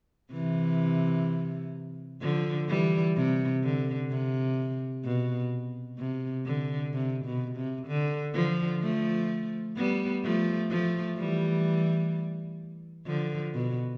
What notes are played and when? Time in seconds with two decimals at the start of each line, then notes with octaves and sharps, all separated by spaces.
0.32 C3 E3
2.22 D3 F3
2.68 E3 G3
3.16 C3
3.63 D3
4.10 C3
5.05 B2
5.98 C3
6.46 D3
6.94 C3
7.25 B2
7.56 C3
7.87 D3
8.34 D3 F3
8.82 F3 A3
9.76 G3 B3
10.24 F3 A3
10.71 F3 A3
11.18 E3 G3
13.07 D3 F3
13.54 B2